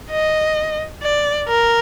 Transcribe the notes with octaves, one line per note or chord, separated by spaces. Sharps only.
D#5
D5
A#4